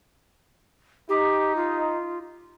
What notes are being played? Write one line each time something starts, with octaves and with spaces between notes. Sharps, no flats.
D#4 G4
F4